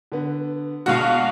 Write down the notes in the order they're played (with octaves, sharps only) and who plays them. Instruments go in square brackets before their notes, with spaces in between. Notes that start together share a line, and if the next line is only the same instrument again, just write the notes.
[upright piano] D3 B3
[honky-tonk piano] A#1 B2 F#4 [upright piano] G#3 [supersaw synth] F5